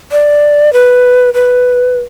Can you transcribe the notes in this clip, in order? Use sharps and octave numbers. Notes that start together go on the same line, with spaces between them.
D5
B4
B4